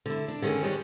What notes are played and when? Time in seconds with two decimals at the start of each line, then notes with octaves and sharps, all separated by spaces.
0.06 D3 E4
0.28 D4
0.42 D3 D#3 C#4 G#4
0.63 G3 G#3 C#5